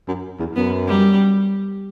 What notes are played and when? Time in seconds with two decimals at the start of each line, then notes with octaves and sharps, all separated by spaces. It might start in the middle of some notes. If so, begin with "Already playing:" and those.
0.08 F#2
0.39 E2
0.56 F#2 B3
0.87 G3